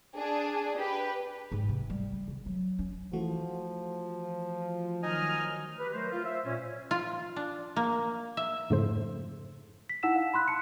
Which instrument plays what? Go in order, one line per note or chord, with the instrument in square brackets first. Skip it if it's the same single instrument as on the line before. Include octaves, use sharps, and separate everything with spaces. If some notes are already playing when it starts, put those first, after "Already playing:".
[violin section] D4 G#4
G4 B4
[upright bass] G#2
C3
G3
C3
D#3
F#3
C#4
[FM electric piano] E3 A3 F#4 [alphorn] F3
[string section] D#3 F#3 F6 [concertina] D#4 D#5 G#5
[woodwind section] G4 B4
F#3 A3 A#4 C5
F4
C5 E5
A#2 C#4
[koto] F4
D4
A#3
E5
[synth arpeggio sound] F2 G#2 C#3 A3 E4 C5
[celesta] B6
D#4 E4 F#5 E6 B6 E7
F5
B5 C6 F#6 B6
A5 C#7